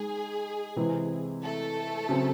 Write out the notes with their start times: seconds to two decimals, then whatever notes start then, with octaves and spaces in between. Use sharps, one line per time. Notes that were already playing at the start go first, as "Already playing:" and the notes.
Already playing: G#3 D#4 G#4
0.76 C3 E3 G#3 C4 E4
1.43 A3 A4
2.09 C#3 F#3 C4